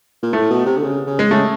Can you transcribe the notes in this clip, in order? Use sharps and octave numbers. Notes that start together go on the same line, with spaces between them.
A#2
A2 A3
B2
C3
D3
C#3
C#3
G#3
C#3 A3